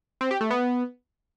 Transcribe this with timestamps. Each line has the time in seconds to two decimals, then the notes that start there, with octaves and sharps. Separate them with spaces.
0.21 C4
0.31 G4
0.41 A3
0.51 B3